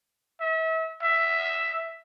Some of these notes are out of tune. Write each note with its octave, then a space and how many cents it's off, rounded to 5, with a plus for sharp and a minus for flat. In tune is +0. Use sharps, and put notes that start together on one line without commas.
E5 -35
E5 +5